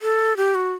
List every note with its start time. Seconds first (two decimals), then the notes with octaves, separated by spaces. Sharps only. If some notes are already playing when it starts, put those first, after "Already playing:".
0.02 A4
0.37 G4
0.55 F#4